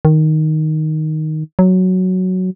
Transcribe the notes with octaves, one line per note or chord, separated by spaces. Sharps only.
D#3
F#3